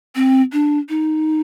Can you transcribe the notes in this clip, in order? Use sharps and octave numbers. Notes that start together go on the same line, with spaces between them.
C4
D4
D#4